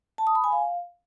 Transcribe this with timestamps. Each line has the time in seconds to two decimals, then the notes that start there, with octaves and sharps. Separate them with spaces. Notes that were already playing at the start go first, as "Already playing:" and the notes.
0.18 A5
0.27 D#6
0.35 B5
0.44 G#5
0.52 F5